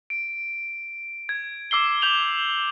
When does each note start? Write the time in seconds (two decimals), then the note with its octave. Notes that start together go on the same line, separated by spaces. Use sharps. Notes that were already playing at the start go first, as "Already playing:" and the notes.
0.10 D7
1.29 G#6
1.71 D6 E6 C7 G7
2.02 D6 G6 F7 F#7